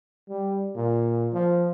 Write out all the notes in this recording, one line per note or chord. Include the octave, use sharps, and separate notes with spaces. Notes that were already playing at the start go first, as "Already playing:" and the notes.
G3
A#2
F3